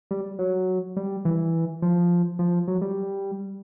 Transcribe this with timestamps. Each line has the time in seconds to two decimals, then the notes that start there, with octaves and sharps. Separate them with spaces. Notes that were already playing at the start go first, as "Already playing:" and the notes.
0.11 G3
0.39 F#3
0.97 G3
1.25 E3
1.82 F3
2.39 F3
2.68 F#3
2.81 G3